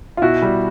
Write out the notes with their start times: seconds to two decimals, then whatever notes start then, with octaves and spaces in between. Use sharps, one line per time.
0.17 F4
0.22 B2 E4 F#4
0.42 G3